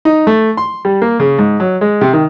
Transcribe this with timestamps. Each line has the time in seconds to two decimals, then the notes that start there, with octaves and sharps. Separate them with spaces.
0.05 D#4
0.27 A3
0.57 C6
0.85 G3
1.02 A#3
1.20 C#3
1.38 G#2
1.60 F#3
1.81 G#3
2.01 C3
2.13 D#3